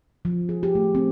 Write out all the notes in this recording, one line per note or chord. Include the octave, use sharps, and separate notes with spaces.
F3
G#4
G4
A3
C4